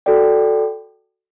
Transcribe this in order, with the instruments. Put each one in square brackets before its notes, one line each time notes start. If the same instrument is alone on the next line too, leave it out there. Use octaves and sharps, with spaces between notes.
[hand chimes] F#4 A4 D5 G5